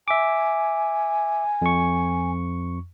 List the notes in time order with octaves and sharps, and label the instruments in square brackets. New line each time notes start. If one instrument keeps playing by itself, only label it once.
[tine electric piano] E5 D6 [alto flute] G#5
[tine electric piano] F2 C#6